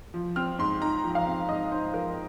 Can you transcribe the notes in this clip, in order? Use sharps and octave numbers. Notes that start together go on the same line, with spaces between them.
F3
C4 F6
G#2 C6
D#4 A#5
F3
F5
C4
G#2 D#5
D#4 C5
F3 A#4